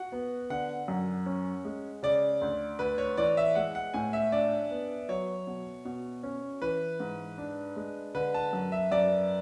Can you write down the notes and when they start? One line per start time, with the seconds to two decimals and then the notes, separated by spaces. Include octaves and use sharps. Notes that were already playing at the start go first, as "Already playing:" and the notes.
Already playing: F#4 F#5
0.12 B3
0.50 D3 F#5
0.88 F#2
1.26 C#4
1.65 G#3
2.03 C#3 D5
2.41 D2
2.79 D2 B4
2.98 C#5
3.17 E3 D5
3.37 E5
3.55 G#3 F#5
3.75 F#5
3.94 A2 G#5
4.13 E5
4.32 D4 D5
4.71 B3
5.09 F#3 C#5
5.47 B2
5.85 B2
6.23 C#4
6.62 E3 B4
7.00 G#2
7.38 D4
7.76 G#3
8.15 D3 B4
8.34 A5
8.53 F#2
8.72 E5
8.91 F#2 D5